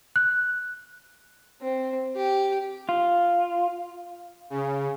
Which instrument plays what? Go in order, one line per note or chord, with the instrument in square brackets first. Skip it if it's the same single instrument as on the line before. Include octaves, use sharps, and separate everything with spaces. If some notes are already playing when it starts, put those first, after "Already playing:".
[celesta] F#6
[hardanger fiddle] C4
G4
[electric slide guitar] F4
[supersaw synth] C#3